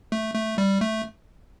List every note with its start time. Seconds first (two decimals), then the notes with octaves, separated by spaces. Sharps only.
0.12 A3
0.35 A3
0.58 G3
0.81 A3